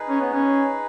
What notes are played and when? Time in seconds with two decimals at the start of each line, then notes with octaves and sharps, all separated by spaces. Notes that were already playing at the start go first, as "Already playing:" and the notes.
Already playing: D#4 G#4 B4
0.09 C#4
0.21 B3
0.34 C#4